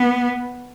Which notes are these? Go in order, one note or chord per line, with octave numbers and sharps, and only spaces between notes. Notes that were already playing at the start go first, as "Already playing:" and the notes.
Already playing: B3